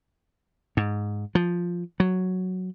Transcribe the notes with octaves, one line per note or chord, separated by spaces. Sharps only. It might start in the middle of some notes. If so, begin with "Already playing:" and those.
G#2
F3
F#3